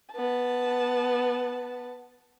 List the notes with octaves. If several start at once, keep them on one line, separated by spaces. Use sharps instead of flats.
B3 A5